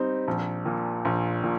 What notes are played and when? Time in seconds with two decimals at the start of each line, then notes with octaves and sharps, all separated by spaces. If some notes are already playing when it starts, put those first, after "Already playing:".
Already playing: G3 C4 D#4
0.28 A#1
0.65 A#2
1.05 A#1
1.43 A#2